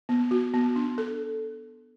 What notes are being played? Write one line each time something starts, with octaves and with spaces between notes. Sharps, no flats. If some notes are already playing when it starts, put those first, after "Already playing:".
B3
F#4
B3
D4
A4